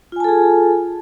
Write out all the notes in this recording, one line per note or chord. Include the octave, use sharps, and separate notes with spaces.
F4 G#4 A4 G#5 A5